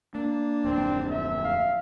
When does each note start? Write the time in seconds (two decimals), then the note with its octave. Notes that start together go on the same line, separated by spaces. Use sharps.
0.15 A#3 D4
0.64 D1 F2 A#3 C4
1.10 E5
1.44 F5